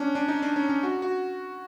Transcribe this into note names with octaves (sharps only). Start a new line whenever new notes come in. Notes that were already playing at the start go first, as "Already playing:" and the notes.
Already playing: C#4 D4
D4
D#4
D4
C#4
C#4
F#4
F#4